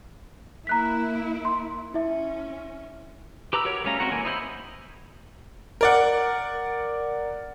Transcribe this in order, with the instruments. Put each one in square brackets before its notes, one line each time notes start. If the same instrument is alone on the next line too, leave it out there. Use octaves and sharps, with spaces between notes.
[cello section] A#3 E4 [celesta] A#5 F#6 B6
[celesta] C6
[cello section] C#4 [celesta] E4 E5
[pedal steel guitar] G4 B4 A#5 D6 E6
F#4 G4 A#4 C#5
G3 A3 C#4 F5 A#5
G#3 C4 F#4 F#5 A#5
E3 A#3 G#5
D#4 E4 C5 B5
[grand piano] A#4 D5 F#5